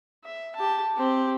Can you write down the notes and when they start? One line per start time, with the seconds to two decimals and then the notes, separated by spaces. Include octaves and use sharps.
0.24 E5
0.56 G4 A5
0.96 C4 G4